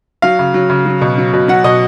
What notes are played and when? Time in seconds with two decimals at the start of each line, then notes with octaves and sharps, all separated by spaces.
0.22 F#3 F5
0.39 C#3
0.54 F#3
0.70 C#3
0.86 F#3
1.01 B2
1.18 F#3
1.33 B2
1.48 F#3 F#5
1.64 B2 D#5